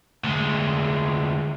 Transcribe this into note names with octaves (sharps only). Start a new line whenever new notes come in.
D2 G#3